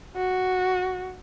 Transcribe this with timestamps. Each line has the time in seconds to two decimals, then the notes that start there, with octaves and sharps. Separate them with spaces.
0.16 F#4